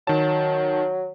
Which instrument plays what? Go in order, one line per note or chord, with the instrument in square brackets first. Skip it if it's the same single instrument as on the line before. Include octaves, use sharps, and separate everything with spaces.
[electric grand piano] D#3 A5 [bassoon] F#3